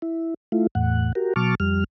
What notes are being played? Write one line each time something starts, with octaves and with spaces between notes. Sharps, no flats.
E4
A3 E4 F4
E2 A2 F#5
F#4 G4 A#4
B2 F#3 A5 C#6 D6 F6
F2 G3 F6